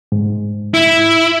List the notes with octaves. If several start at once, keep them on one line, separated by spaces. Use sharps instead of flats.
G#2
E4